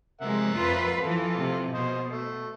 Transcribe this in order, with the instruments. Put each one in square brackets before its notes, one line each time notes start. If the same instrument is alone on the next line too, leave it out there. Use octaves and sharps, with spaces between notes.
[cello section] C3 F3 G#3 [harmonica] A#4 E5 F#5
[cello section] F2 F4 B4
[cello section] E3 F3 [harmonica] F4 A4
[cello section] C3
[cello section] B2 [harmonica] C5 D#5
[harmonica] A3